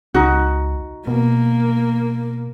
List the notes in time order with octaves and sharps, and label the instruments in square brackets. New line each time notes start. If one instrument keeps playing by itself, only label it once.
[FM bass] C#2 [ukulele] D#4 F#4
[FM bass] B2 [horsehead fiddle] A#3